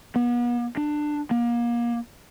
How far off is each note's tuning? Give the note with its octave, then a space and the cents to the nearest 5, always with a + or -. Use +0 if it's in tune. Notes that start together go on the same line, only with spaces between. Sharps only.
B3 -40
D4 +20
A#3 +30